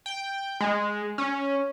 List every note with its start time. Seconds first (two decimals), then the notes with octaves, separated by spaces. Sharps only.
0.06 G5
0.60 G#3
1.18 C#4